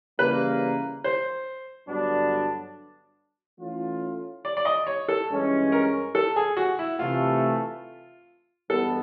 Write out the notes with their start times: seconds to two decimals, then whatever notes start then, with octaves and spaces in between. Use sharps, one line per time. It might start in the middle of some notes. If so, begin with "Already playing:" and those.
0.19 C#3 E3 G3 A#3 B4
1.04 C5
1.89 G2 D3 F#3 B3 D4
3.60 E3 A3 C#4 F4
4.45 D5
4.57 D5
4.65 D#5
4.87 C#5
5.08 A4
5.30 G2 E3 G#3 C#4
5.72 A#4
6.15 A4
6.36 G#4
6.57 F#4
6.79 E4
6.99 C3 E3 A3 F4
8.70 G2 E3 G#3 B3 A4